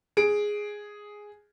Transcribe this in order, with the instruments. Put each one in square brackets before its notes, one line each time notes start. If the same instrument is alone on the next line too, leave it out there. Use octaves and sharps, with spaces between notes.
[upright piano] G#4 D7